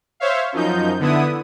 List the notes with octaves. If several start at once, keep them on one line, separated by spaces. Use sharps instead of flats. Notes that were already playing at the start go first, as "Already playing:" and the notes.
C5 C#5 E5 F5
F#2 F3 D#4 G6
D3 B3 E4 D#6